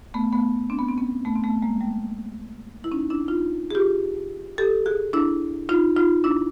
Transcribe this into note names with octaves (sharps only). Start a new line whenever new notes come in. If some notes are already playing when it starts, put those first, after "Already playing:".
A3 B3
A3 B3
C4 D4
B3
C4
B3 C#4
A3 B3
C4
A3 B3
G#3 A#3
G3 A3
E4
C#4 D#4
D4 E4
D#4 F4
G#4
F4 G4
G4 A4
F#4 G#4
D4 E4
D#4 F4
D#4 F4
D4 E4